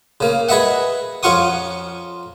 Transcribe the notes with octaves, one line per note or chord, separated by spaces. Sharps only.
C#3 A#3
G#4 B4 D#5 E5 F#5
F2 C#4 F4 F#5 C#6 D#6